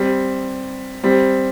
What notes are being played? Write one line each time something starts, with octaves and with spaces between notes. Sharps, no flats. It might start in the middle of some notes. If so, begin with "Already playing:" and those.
Already playing: G3 C4
G3 C4